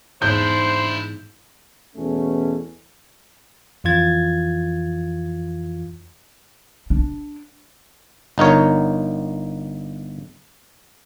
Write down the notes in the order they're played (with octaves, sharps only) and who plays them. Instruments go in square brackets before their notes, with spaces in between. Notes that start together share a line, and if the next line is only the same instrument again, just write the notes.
[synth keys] E2 G#2 [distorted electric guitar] D4 E4 [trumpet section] C5 [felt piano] G6
[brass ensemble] E2 B2 A3 C#4
[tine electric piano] F2 E3 F4 G#6 A6
[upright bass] D4
[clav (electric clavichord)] G1 D#4 A#4 C#5